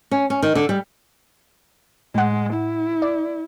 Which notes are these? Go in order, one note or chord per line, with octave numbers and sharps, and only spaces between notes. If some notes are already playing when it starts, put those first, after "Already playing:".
C#4
C#4
D#3
D3
G3
A2 G#3 F#5
E4
D5